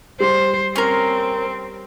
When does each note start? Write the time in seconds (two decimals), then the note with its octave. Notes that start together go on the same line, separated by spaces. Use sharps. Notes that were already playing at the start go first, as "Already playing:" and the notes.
0.20 G3 C5
0.76 C4 C#4 A#4